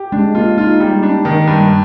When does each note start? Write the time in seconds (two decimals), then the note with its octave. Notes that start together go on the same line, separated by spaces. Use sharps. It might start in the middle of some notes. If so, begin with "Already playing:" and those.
Already playing: G4
0.12 G#3 D4
0.35 A#3 F4
0.58 D#4 F4
0.80 G3 G4
1.03 D4
1.25 D#3
1.47 G2